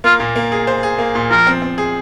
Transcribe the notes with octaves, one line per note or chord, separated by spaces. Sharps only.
A#3 F4
A#2
A#3
G#4
C5
G#4
A#3
A#2
F3 A#4
C4
C4
G#4